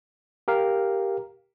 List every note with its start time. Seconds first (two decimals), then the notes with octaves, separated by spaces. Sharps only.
0.48 G4 A#4 F5